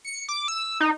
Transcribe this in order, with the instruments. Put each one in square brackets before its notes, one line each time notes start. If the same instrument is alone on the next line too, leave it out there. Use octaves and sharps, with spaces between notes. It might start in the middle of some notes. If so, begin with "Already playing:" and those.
[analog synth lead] C#7
D6
E6
D#4